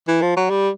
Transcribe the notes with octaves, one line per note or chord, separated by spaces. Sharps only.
E3
F3
F#3
G3